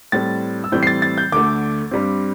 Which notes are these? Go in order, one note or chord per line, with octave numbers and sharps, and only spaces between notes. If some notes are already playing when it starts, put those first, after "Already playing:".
A2 G3 C4 A6
E6
A2 E3 G3 C4 G6
C7
A6
A6
G6
D2 D3 A3 D6
G2 G3 C4